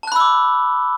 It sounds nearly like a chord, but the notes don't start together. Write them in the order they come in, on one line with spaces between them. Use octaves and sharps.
A5 F#6 B5 E6 D6